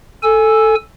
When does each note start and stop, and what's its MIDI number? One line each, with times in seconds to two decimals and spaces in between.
0.23 0.75 69
0.23 0.75 80
0.23 0.75 88